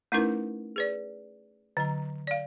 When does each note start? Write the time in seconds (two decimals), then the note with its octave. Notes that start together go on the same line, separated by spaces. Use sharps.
0.12 A3 C#4 D#4 E4 A#4 B4
0.76 G#4 B4 D5
1.77 D3 F#3 A#5
2.27 D5 F5